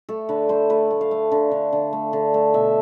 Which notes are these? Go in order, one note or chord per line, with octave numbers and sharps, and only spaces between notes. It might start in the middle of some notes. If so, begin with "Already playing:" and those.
A3 A4
D3 B4
A3 C5
A3 B4
A3
F5
A3
D3
D3
D3
A3
D3
A3
B2 E5